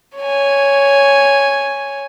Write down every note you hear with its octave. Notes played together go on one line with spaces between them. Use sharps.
C#5 G#5